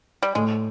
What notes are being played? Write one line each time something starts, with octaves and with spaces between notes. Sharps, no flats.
G3
A2 G#3